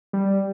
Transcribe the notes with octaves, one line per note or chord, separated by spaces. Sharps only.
G3